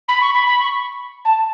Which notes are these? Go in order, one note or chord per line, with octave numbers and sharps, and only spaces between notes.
B5
C#6
B5
B5
C#6
A5